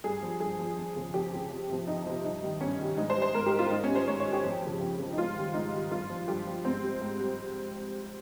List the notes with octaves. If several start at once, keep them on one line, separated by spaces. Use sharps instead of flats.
G2 G#4
F3
G2 G#4
F3
F2
C#3 F3
F2 G4
C#3 F3
F2
C3 F3
F2 D#4
C3 F3
G2 D#4
D#3 G3
G2 C#4
D#3 G3
G#2 D#4
C5
G3
C5
G#2 A#4
G4
G3
F4
G#2 D#4
C#4
G3
C5
G#2 C#5
C#5
G3
G4
F2
C#3 F3
F2
C#3 F3
D#4
G#2 F4
D#3 G3
G#2 D#4
D#3 G3
G2 F4
F3
G2 G4
F3
G#2 C4
G3
G#2
G3